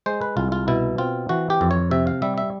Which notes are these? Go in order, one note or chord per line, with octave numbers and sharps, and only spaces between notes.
G#3 C5
B4
C2 F4
F4
B2 E4
C4 F4
E3 F#4
G4
F2
C#5
C3 E5
F5
G3 E5
E5